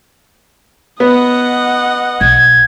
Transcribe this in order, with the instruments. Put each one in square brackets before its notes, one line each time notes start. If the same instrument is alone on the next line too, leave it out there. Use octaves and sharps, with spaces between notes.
[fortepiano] B3 [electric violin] D#5 F#5
[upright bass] B1 [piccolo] G#6